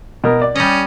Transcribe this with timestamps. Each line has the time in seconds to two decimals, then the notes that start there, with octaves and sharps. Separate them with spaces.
0.24 B2 A#4
0.42 D5
0.55 G3 C#4 D#5